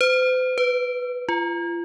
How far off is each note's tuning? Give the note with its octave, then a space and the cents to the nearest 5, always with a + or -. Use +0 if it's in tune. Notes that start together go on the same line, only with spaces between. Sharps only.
C5 -45
B4 +5
F4 -35